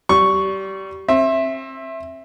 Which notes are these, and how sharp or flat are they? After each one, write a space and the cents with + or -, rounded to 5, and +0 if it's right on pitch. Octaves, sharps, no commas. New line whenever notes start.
G3 -25 C#6 +0
C4 +35 E5 +0